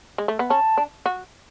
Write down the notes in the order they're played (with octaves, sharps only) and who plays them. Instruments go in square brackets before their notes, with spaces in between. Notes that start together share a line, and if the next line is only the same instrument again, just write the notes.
[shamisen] G#3
A3
B3
[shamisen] C#4 [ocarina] A5
[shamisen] D4
F#4